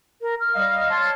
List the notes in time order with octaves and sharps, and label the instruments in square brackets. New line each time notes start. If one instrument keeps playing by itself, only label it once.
[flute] A#4
F6
[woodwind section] G3 D#5 F5
C#5 A5 C6